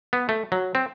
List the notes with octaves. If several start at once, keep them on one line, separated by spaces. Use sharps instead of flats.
B3
A3
F#3
C4